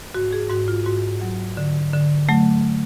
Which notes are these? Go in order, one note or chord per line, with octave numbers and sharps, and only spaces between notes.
G#2 F#4
G#4
G#2 F#4
F4
G#2 F#4
F#3
D3
D3
F#3 A3